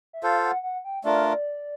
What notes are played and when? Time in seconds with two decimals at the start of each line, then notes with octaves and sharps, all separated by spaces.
0.13 E5
0.23 F4 A4 C5 F5
0.43 F#5
0.63 F#5
0.85 G5
1.04 A3 D4 F4 A#4 D5